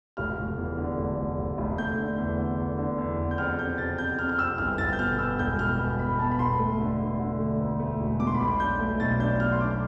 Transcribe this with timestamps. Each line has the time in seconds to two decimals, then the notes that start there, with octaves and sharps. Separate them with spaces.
0.17 F1 F6
0.38 F1
0.57 E2
0.77 D3
0.98 F1
1.18 F1
1.38 F1
1.58 F1
1.78 A3 G6
1.98 D3
2.18 E2
2.38 D3
2.59 E2
2.78 D3
2.98 E2
3.18 E2
3.31 G6
3.38 F2 F6
3.58 C3 G6
3.78 C3 A6
3.98 F2 G6
4.19 C3 F6
4.29 F6
4.39 F2 E6
4.58 G1 F6
4.78 G1 A6
4.93 G6
4.99 B2 F6
5.19 B3 E6
5.39 E1 G6
5.59 B2 F6
5.79 B3
5.99 B3 B5
6.19 B3 A5
6.31 B5
6.39 E1 C6
6.59 A3
6.80 D3
7.00 D3
7.20 D3
7.39 A3
7.60 D2
7.79 A3
8.00 E1
8.20 B2 D6
8.27 C6
8.34 B5
8.40 B1 C6
8.60 D4 G6
8.80 A3
9.00 B1 A6
9.20 D4 G6
9.40 B2 F6
9.52 C6
9.60 D4 D6